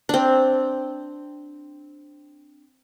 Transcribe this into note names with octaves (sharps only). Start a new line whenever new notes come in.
C4 D4